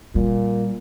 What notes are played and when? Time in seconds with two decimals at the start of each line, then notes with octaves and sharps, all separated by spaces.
0.15 A#2 G3